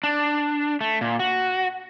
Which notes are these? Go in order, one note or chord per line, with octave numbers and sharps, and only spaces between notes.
D4
A3
A#2
F#4